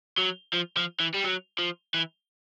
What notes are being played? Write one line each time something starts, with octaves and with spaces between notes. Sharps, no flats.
F#3
F3
F3
E3
G3
F#3
F3
E3